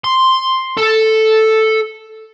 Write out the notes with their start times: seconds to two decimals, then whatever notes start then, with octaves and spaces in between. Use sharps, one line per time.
0.04 C6
0.78 A4